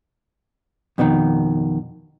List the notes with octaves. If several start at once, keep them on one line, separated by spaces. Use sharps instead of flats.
F2 B2 D3 D#3